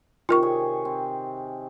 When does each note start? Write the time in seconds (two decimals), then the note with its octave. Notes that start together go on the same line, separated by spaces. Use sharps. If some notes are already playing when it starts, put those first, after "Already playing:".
0.29 C3 D#3 F4 A#4 C#6
0.42 C3 G#4 C#5
0.85 C4